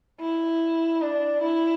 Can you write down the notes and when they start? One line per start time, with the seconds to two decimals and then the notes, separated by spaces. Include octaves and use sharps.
0.21 E4
1.02 D4
1.42 E4